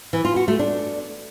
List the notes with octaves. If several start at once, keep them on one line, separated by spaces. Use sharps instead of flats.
E3
F4
F#4
A3
D4